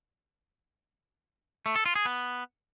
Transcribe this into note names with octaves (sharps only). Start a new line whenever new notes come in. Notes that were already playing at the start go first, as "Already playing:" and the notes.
A3
A4
F4
G#4
B3